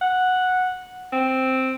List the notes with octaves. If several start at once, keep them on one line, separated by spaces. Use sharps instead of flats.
F#5
C4